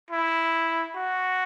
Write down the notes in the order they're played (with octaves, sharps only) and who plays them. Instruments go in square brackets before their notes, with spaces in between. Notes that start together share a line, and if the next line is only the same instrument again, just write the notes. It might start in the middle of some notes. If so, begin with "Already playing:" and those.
[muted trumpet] E4
F#4